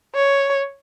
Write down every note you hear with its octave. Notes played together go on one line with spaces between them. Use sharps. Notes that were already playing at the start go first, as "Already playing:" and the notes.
C#5